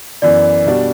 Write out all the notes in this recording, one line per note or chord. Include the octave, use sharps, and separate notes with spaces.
F#2 E3 B3 D5
B2 G3 D4 F#4